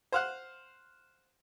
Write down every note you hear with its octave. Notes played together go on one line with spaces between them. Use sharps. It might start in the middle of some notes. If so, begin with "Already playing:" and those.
C5 F5 F#5